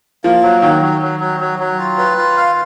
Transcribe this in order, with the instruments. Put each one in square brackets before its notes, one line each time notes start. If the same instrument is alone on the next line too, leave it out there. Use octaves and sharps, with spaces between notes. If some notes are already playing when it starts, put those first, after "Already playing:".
[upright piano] F3 [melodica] A#3
[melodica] F#3
[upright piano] D#3 [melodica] F#3
[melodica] F#3
F#3
F#3
F#3
F#3
F4
B4
F4
F5